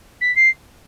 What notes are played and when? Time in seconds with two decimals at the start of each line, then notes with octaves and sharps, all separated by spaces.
0.21 B6
0.35 C7